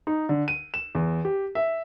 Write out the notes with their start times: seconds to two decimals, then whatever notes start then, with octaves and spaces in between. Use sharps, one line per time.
0.07 D#4
0.29 D3
0.48 D#7
0.74 E7
0.95 E2
1.25 G4
1.55 E5